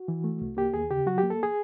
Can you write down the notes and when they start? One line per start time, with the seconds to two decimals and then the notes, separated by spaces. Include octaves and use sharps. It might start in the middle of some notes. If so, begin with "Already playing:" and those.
Already playing: F#4
0.08 E3
0.24 A3
0.41 C2
0.57 A#3 G4
0.74 D#2 G#4
0.91 C#3 G4
1.06 F#3 F#4
1.18 G4
1.23 A#3
1.30 A4
1.43 G#4